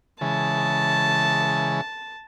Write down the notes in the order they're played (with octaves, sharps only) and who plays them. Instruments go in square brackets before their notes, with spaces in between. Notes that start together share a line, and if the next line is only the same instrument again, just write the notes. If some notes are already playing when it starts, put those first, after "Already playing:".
[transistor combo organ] C#3 E3 G#3 [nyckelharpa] A5